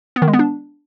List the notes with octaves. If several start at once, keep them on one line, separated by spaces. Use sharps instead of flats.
B3
D#3
G#3
B3
D4